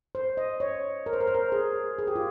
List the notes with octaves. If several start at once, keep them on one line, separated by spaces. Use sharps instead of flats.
C5
D#5
C#5
A#4
C5
A#4
C5
A#4
G#4
G#4
G4
F4